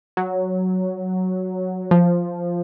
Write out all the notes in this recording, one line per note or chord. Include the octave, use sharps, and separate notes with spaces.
F#3
F3